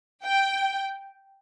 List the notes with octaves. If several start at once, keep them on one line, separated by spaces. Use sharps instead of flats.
G5